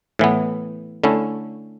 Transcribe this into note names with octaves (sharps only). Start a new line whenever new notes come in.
A2 E3 B3
D3 A3 C#4 E4